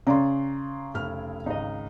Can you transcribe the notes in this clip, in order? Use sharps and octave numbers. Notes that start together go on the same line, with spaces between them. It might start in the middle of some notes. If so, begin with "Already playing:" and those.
C#3 D5 A#5 C6
F1 E4 F6
G#1 C#2 D#4 D#5